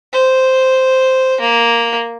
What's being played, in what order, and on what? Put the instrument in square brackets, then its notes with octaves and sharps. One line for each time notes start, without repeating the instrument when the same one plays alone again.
[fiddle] C5
A#3